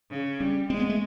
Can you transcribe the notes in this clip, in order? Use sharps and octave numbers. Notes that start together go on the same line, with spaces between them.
C#3
G3 C#4
G#3 C4
B3
A3